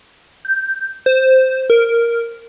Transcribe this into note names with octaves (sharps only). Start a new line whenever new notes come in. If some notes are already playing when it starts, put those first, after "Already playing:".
G6
C5
A#4